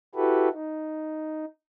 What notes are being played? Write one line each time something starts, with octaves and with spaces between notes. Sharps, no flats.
E4 F#4 G4 A4 B4
D#4